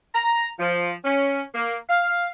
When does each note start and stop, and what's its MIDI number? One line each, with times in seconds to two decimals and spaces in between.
0.15 0.47 82
0.59 0.92 53
1.05 1.42 61
1.54 1.75 58
1.89 2.29 77